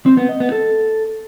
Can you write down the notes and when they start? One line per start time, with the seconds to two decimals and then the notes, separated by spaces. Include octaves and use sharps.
0.06 C4
0.17 B3
0.29 D#5
0.40 B3
0.52 A4